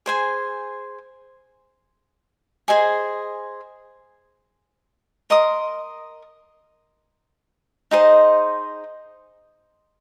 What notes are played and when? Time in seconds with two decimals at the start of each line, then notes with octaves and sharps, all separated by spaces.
0.06 G#4 C5 G#5
2.68 G#4 C5 D#5 G#5
5.30 A#4 D#5 C6 D#6
7.91 D#4 G#4 C5 D#5